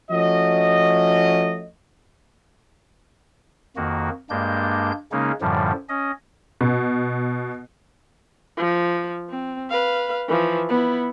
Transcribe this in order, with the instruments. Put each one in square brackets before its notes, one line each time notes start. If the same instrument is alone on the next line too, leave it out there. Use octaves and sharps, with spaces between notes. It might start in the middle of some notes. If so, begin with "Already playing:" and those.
[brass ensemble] F3 A3 C#4 F#4 D#5
[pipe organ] F2 D#3 A#3 F#4
G2 G#3 A#3 D4 G6
C#3 G#3 A#3 C#4 D#4
F#2 A2 D3 F3 G3
C#4 D#5
[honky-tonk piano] B2
[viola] F3
C4
B4 F5
E3 F3
B3 E4